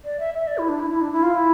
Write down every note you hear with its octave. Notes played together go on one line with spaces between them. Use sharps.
D5
E5
E5
D5
E4
D4
E4
E4
D4
E4
F4
E4